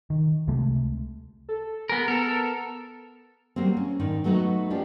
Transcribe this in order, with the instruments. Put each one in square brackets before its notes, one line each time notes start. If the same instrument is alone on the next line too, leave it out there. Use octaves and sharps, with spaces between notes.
[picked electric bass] D#3
C#2 C3 G#3 A3
[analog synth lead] A4
[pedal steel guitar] B3 A#4 [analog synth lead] G#4
[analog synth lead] B3 [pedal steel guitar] A4 A#4
[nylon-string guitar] F#3 G3 A#3 C4
C#4
G#2 D#3 D4 D#4
F#3 A3 B3 D#4 F#4
F3 C#4 D4 F4 G4